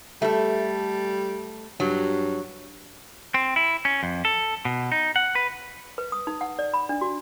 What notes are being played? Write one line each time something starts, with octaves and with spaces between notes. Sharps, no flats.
G3 A3 A4
G2 F#3
C4
E4
C#4
F2
A4
B2
D#4
F#5
B4
B4
D#6
D#4
F#5
D5
B5
D4
F#4